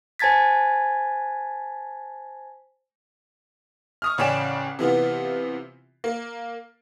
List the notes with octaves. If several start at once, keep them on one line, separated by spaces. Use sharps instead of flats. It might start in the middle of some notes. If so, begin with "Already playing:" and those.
C5 G#5 A5 G#6 A6 B6
C#6 D#6 F6
A1 C#3 C#4 D5 G5 E7
C3 E3 B3 F4
A#3